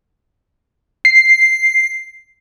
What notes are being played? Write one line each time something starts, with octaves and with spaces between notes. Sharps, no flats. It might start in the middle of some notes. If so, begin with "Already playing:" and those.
C7